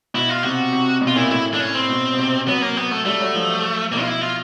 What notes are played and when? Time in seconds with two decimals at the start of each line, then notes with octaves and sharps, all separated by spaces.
0.14 B2 E4
0.30 F4
0.43 C3 F#4
0.72 C3
1.01 B2
1.07 F4
1.16 A#2 E4
1.30 A2 E4
1.54 D4
1.60 C#4
1.74 C4
1.89 B2
2.13 B2
2.18 C3
2.47 F#3 B3
2.62 A#3
2.77 B3
2.91 A3
3.05 G3 A3
3.20 F#3
3.35 F3
3.92 B2 A#3
4.01 F4
4.08 E4
4.21 F4